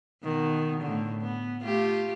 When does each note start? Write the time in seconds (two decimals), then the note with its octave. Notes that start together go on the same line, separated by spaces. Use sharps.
0.24 B2 D#3
0.82 A2 D3
1.22 B3
1.63 A3 F4 G4